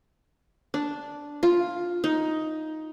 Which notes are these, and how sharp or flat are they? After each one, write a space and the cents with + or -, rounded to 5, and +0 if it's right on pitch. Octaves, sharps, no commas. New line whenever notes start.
D4 -5
F4 +5
D#4 +10